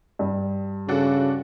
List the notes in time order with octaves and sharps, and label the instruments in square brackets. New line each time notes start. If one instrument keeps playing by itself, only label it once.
[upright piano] G2
[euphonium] C#3 [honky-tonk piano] D4 F#4 A4